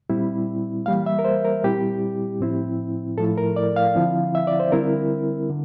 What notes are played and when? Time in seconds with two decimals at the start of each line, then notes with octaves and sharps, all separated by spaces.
0.10 A#2 G3 C4 E4
0.86 E3 G3 A#3 F5
1.06 E5
1.19 A#4
1.25 C5
1.45 A#4
1.64 A#2 G3 C4 E4 G4
2.40 A2 F3 C4 E4
3.18 A2 F3 A3 E4 A4
3.37 A#4
3.56 D5
3.76 F5
3.95 D3 F3 C4 E4
4.35 E5
4.47 D5
4.60 C5
4.72 D3 G3 C4 E4 A#4
5.50 D3